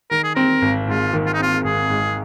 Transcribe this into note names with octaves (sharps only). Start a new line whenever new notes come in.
D#3 A#4
G#4
C4 A#4
G#1
G#2 F4
D#3
F4
D#4
C4 F4
G#1 G#4
G#2